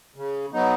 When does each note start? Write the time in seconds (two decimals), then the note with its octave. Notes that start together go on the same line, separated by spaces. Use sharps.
0.16 C#3
0.53 F#3 B3 D#4